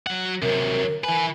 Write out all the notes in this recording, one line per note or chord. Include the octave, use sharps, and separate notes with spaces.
F#3 F#5
C3 F#3 A#4
E3 B4 G#5